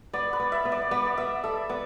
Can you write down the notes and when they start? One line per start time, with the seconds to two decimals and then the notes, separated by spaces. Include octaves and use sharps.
0.13 B3 D5
0.33 B4
0.39 B3
0.52 E5
0.65 B3
0.72 D5
0.91 B3 D5
1.17 B3 E5
1.44 A4 E5
1.69 B3 D5